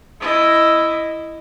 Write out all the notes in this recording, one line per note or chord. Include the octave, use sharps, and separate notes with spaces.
E4 D#5